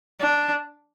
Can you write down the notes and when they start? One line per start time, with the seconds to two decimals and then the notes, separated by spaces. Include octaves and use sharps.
0.20 D4